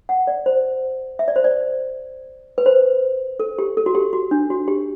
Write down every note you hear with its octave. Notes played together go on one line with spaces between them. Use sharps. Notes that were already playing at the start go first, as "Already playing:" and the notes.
F#5
D5
C5
E5
D5
C5
D5
B4
C5
A4
G4
A4
F#4
G4
F#4
D4
F#4
G4